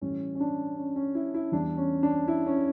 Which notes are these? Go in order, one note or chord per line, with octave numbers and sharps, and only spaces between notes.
A2 E3 G3 C#4
C#4
D4
C#4
C#4
E4
E4
E2 E3 G3 D4
C#4
D4
E4
C#4